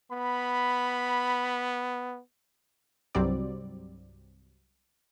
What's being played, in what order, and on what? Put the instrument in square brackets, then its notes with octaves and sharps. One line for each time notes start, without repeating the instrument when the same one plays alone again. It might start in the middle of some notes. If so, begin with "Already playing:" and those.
[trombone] B3 [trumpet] B5
[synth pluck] C2 G2 F#3 G3 C4 D5